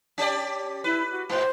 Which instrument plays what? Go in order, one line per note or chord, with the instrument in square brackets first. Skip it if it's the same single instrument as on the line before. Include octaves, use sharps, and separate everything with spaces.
[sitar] C#4 G4 D5
[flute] E4 [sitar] B4
[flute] F#4
[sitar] G#2 B2 [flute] C5